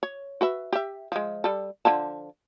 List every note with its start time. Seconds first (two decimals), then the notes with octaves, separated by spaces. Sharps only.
0.03 C#5
0.41 F#4 B4 E5
0.72 G4 E5
1.12 F3 G#3
1.44 G3 A4
1.85 D3 F3 A5